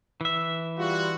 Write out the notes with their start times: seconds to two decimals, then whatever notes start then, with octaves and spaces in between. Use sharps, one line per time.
0.21 E3 E5
0.78 G3 F4 F#4